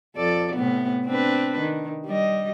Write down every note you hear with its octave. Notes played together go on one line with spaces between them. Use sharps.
F2 A4 D5
A2 C3 B3
C4 D4 B4
D#3
G3 D#5